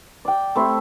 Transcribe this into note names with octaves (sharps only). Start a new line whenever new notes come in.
D5 G5
A3 C4 E4